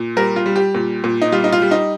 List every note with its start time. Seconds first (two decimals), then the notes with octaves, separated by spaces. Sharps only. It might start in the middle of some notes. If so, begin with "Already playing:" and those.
Already playing: A#2
0.17 G3 A#4
0.36 F4
0.46 G3
0.56 G4
0.75 A#2
1.04 A#2
1.21 D#4
1.32 G3 F4
1.44 D#4
1.52 F4
1.62 G3
1.71 D#4